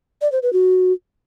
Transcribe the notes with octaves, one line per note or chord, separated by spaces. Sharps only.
D5
C5
B4
F#4